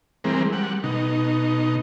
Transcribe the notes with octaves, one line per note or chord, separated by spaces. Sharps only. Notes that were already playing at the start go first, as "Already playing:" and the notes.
E3 G3 G#3 C4 A#4
G3 F#5
B2 D#4